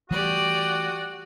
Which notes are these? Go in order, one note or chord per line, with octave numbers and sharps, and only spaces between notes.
E3 G3 A3 F#4 G4 D5 D#6